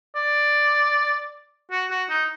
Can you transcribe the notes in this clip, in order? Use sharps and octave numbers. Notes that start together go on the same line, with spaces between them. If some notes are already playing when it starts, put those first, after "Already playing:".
D5
F#4
F#4
D#4